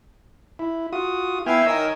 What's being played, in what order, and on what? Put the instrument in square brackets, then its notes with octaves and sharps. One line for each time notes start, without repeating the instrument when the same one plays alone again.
[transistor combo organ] E4
F4 F#4 D#6
[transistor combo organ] B3 G5 G#5 [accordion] E4 E5 F5
[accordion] D#3 A#4 E6 [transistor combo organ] C#5 D#5 G#5